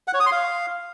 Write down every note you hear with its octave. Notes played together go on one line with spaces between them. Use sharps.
F#5
C#5
D#6
C6
F5